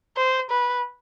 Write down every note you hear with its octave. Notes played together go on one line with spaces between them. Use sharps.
C5
B4